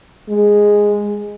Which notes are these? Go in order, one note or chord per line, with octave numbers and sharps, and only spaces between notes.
G#3